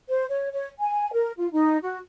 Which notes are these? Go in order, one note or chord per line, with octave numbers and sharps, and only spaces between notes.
C5
C#5
C#5
G#5
A#4
F4
D#4
F#4